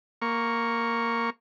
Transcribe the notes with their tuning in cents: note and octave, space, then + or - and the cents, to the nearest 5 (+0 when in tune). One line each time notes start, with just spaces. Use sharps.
A#3 -5 C#6 +0